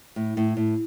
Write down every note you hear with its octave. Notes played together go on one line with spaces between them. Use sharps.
A2
A2
A2